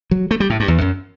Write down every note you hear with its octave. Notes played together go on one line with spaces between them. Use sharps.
F#3
A3
G3
A2
G2
E2
F#2